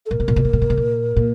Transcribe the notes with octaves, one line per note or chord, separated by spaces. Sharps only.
A4
A#2 A#4
B2
A#2
B2
A#2
B2
A#2
B2
A#2
A#2